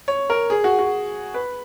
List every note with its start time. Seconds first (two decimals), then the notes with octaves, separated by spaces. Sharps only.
0.08 C#5
0.30 A#4
0.50 G#4
0.64 F#4
0.79 F#4
1.34 B4